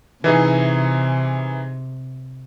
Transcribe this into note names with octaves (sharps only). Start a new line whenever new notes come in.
C3 E3 D#4 G#4